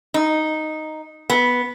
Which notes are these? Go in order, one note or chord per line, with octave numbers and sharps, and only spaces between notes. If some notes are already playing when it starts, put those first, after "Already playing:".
D#4
B3